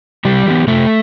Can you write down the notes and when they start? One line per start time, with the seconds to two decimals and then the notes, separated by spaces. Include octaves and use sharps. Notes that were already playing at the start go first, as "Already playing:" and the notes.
0.25 C3 G3 G4
0.46 E3 B3
0.67 C3 A3 A4